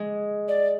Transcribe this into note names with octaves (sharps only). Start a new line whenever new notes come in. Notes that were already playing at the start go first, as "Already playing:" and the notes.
Already playing: G#3
D5